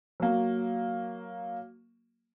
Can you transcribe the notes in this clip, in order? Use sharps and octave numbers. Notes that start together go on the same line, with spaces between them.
F#3 A#3